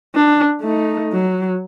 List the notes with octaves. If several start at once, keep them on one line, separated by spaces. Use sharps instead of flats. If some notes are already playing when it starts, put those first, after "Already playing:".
D4
A3 D#4
F#3